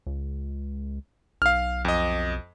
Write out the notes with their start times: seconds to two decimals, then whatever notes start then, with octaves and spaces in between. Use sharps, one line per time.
0.07 C#2
1.42 B1 F5 F6
1.85 F2 D#5